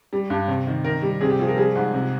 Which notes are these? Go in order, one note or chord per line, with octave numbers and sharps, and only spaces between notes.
G3
G2
C3
D#3
D#3 A#4
G3
C3 G#4
G4
F3 G#4
A#4
G3 G#4
G#2
C3